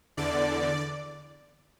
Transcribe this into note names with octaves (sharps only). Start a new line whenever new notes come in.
E2 D3 D5